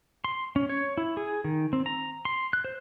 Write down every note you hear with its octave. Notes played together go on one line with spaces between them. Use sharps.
C6
C#4
C#5
E4
G#4
D#3
C4
A#5
C6
F#6
C5